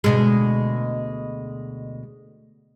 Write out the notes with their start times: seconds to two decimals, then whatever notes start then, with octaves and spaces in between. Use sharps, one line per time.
0.04 D2 B2 G#3